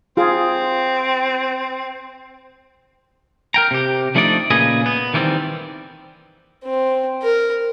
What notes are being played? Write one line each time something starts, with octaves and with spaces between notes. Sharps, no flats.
C4 F4 G#4
A#4 G5 A#5
C3 G4
F3 A3 D4 D#4 D5
A#2 C#3 G#4 B4 D#5
B3
D#3 E3 G3 A3 C4
C4
A#4